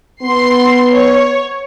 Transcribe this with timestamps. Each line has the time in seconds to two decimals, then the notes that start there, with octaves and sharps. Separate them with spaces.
0.22 B3 C6 C7
0.91 C#5